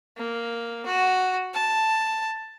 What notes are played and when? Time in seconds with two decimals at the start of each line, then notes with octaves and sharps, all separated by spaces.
0.17 A#3
0.86 F#4
1.54 A5